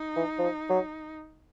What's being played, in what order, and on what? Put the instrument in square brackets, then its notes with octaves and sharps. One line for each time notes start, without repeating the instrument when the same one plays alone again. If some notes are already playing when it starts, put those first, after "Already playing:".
Already playing: [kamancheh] D#4
[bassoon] E3
F3
F#3